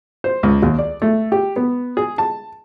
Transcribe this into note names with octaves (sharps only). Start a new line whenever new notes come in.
C5
C#2
D#2
D5
A3
G4
B3
G#4
A5